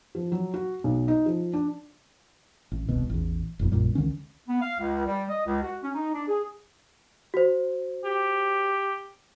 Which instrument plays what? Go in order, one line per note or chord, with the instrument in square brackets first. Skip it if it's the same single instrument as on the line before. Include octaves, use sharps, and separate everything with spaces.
[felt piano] F3
F#3
F#4
B1
D#4
F3
D4
[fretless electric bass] A1
D#1 C2 B2
A1 E2
F#1 B1 F2
A#1 F#2 A#2 G3
C#2 D3 D#3 C#4
[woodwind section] B3
F5
C#2
G3
D#5
C#2
F#4
C#4
D#4
D4
G#4
[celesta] F#4 C5
[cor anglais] G4